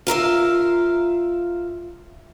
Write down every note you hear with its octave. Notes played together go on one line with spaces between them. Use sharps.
F4 A#4 E5 F5